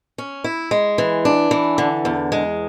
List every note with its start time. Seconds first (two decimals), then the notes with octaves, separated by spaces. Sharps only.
0.18 C#4
0.44 E4
0.71 G#3
0.98 E3
1.25 D4
1.51 E3
1.78 D3
2.05 E2
2.32 G#3